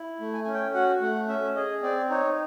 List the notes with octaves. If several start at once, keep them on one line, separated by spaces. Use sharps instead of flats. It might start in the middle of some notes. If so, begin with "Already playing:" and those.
Already playing: E4
A3
G#5
C#4 G#5
G5
F#4 F#5
A3 F#5
C#4 E5
G#4 D#5
C4 D5
D#4 C#5